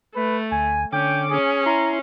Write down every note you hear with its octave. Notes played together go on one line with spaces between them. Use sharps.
A3 B4
D2 G#5
D3 C#4 G5 D6
C#4 G#4
E4 A#5 C6